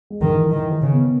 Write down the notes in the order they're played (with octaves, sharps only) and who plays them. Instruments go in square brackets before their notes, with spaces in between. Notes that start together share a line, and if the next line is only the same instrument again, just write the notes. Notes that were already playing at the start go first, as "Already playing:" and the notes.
[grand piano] G#3
[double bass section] D#3
[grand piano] E3
[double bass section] D#3 [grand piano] E3
[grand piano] A#4
[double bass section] C#3
[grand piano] B3